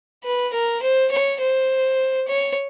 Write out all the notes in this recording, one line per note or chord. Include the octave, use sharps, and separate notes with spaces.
B4
A#4
C5
C#5
C5
C#5